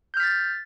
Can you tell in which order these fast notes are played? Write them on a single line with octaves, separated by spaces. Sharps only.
G6 F6 B6 A6